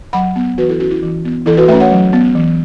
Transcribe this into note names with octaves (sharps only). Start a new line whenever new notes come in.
F#3 F#5 B5
B3
E3 F#4 B4
E4 A4
C#4 F#4
E4
E3
B3
E3 E4 A4
F#4 B4
A3 C#4 B4 E5
C#5 F#5
F#3
B3
E3